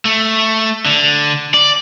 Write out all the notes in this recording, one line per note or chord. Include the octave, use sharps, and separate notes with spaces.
A3
D3
D5